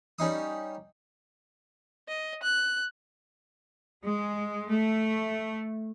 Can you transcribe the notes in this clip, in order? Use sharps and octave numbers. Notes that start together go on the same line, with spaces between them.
G3 C#4 D#4 D#6
D#5
F#6
G#3
A3